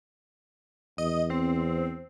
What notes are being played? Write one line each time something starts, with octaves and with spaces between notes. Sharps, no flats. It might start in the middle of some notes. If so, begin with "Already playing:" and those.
E2 D#5
C4